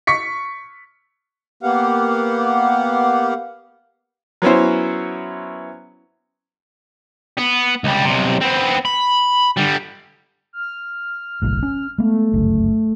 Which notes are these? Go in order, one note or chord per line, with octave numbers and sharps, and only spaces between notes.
C#6 B6 C#7
A#3 B3 G4 F5 F#5
F#3 B3 C#4 E4 C5
B3
C#2 G3
B1 C3
B3 C4
B5
D3 G3
F6
F#1 B1 A2
C#4
G#3 A3 B3
G1 C#2 F#2